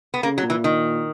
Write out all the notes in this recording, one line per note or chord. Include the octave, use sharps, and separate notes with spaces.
B3
C#3 A#3
F#3
A#2
E3
D#3